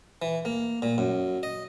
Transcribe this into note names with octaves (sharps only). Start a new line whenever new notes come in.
E3
A#3
A#2
F#2
D#5